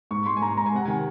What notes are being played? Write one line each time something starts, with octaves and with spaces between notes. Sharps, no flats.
G#2 C#6
G#2 C6
G#5
G#2 A#5
G#2 A#5
G#5
C3 F#5
D#3 G#5